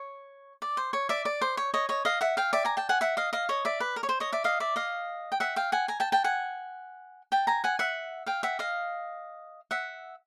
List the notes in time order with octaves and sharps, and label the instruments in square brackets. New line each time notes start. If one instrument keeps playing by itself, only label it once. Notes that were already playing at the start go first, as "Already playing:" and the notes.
Already playing: [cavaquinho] C#5
D5
C5
C#5
D5 E5
D5
C5
C#5
C#5 D#5
C#5 D#5
D#5 F5
E5 F#5
F5 G5
D5 E5
G#5 A#5
G5 A5
F#5 G#5
E5 F#5
D#5 F5
D#5 F5
C#5 D#5
D5 E5
B4
A#4
C#5
C5
C#5 D#5
D5 E5
D#5 F5
D5 E5
D#5 F5
G5
E5 F#5
F5 G5
F#5 G#5
G#5 A#5
G5 A5
G5 A5
F#5 G#5
G5 A5
G#5 A#5
F#5 G#5
E5 F#5
F5 G5
E5 F#5
D#5 F5
E5 F#5